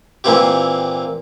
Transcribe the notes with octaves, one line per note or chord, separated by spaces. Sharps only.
A#2 E3 A#3 C4 E4 G4